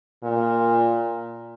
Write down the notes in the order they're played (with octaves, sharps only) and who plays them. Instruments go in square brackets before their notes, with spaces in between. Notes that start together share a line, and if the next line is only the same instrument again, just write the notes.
[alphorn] A#2